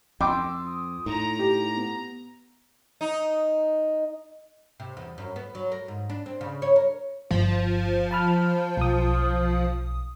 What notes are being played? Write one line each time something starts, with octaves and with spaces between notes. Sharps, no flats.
F2 G5 C6 D6 E6
D#6
A2 D#4 A#5
G4
B3
D#4
C3
E2
F#2
B3
F#3
A#4
G#2
D4
C4
C#3
C#5
A#4
G1 F3
A5 B5 F6
B1 D#6